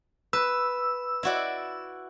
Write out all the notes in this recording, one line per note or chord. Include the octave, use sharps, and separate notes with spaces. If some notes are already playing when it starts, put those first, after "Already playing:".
B4 E6
E4 F#4 D5